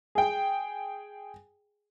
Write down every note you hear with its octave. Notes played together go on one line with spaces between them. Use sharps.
G#4 G5